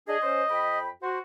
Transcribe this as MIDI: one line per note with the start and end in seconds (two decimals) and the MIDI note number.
0.08 0.18 62
0.08 0.18 68
0.08 0.79 75
0.23 0.44 61
0.23 0.44 72
0.50 0.88 41
0.50 0.88 79
0.50 0.88 83
1.03 1.19 66
1.03 1.19 72